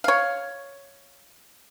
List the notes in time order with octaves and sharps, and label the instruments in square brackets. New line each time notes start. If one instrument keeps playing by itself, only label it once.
[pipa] C#5 F5